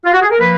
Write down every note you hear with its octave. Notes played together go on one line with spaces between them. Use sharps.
F4
F#4
G#4
A#4
F3 A#3 B4